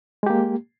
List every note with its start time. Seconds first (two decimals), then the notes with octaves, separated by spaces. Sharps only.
0.23 G#3
0.26 G4
0.30 A#3